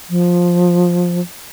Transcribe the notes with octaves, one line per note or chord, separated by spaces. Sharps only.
F3